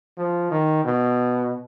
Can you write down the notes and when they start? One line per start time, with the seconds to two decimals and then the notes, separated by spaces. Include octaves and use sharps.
0.18 F3
0.51 D#3
0.85 B2